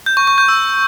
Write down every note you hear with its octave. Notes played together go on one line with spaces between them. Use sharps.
G6
C#6
C#6
G6
E6